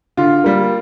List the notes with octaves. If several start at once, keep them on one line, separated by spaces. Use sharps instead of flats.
D3 F4
G3 A#3